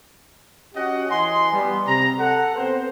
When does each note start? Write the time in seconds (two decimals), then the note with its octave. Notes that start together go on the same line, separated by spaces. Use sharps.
0.75 C#4 F#4 G4 D#5 F#5
1.10 E3 D#5 G#5 C6
1.52 G3 B3
1.87 C3 A#5
2.19 A4 F#5
2.56 B3 C4 B4 C5